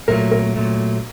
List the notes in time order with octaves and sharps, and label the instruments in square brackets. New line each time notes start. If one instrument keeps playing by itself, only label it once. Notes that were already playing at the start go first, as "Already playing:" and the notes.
[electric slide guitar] A#2 F#3 A3 [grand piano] A#4
[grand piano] A#4
[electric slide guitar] A#2 F#3 A3